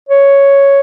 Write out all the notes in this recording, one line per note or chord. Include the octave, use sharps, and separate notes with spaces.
C#5